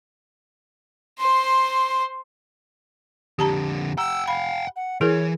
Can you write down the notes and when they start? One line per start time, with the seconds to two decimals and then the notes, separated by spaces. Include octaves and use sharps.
1.19 C5 C6
3.39 F2 D3 G4 A5 A#5
3.98 F#5 G5 A#5 E6
4.28 F5 B5
4.76 F#5
5.01 E3 E4 G#4 A#4 C#5